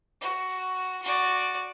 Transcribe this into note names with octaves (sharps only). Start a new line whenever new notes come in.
F#4
F#4 D5